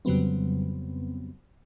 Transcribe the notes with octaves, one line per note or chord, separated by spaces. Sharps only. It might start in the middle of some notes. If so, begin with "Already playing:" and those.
F2 C#3 F#3 G3 B3 C4